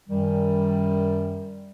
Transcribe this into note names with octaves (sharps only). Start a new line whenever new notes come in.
F#2 D#3 G3